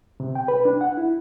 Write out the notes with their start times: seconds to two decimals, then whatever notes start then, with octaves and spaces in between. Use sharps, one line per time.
0.20 C3
0.35 G5
0.48 B4
0.65 D4
0.81 F#5
0.97 E4